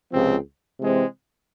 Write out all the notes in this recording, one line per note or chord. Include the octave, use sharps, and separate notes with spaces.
C#2 C3 F3 C4
C3 E3 G#3 C4